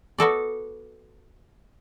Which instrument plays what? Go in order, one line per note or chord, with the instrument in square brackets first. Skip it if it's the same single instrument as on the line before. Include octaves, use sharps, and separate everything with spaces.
[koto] B3 F#4 A4 D5